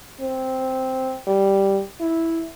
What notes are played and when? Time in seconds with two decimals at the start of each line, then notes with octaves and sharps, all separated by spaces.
0.21 C4
1.28 G3
2.01 E4